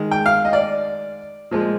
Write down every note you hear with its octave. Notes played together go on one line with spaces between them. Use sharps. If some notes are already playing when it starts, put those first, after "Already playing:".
Already playing: D#3 G#3
G5
F5
D#5
D5
A#2 F3 G#3